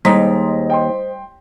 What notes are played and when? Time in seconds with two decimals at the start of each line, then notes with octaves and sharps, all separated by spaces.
0.05 D#2 G3 G#3 C5 D#5 A#5 B6
0.70 G5 C6